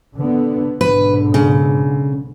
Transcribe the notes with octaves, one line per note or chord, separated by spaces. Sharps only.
D3 B3
B1 G#2 D3 B4
C#3